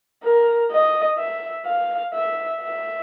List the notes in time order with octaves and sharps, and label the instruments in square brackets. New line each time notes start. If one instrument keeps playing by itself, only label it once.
[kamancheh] A#4
D#5
E5
F5
E5
E5